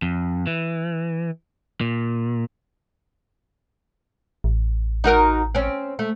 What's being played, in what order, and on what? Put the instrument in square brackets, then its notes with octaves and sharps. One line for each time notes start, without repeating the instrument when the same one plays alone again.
[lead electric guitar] F2
E3
A#2
[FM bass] A1
[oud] D#4 F#4 A#4
C4 C#4
A3